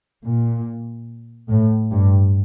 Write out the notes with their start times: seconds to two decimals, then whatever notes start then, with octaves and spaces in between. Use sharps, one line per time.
0.25 A#2
1.49 A2
1.91 G2